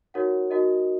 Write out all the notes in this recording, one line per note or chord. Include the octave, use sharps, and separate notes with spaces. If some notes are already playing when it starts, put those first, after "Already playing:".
D#4 F#4 A#4 C#5 F#5
D#4 F#4 A#4 D#5